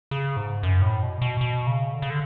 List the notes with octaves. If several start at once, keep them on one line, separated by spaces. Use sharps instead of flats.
C#3
G#2
F#2
A2
B2
B2
B2
C#3
D3
C#3
D3